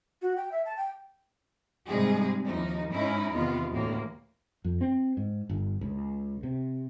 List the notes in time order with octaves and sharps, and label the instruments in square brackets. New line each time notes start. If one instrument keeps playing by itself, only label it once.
[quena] F#4
G5
E5
A5
G5
[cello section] G#2 C3 G3 G#3 D#4 G#4
D#2 E3 F3 D#4
G#2 C#4 D#4 E4
E2 C3 D#3 B3 F4
D2 A2 E3 A#3
[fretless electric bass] F2
C4
G#2
G1
C#2
C3